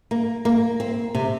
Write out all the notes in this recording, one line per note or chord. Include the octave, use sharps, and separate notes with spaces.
A#3
A#3
C4
C3